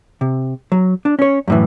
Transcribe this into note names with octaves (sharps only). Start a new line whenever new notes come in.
C3
F#3
D4
C#4 C#5
F#2 A2 E3